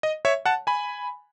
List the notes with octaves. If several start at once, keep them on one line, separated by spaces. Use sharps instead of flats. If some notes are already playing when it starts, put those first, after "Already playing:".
D#5
C#5 E5
F#5 A5
G#5 B5